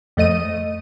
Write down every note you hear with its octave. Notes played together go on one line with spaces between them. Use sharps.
F2 A3 D#5 D#7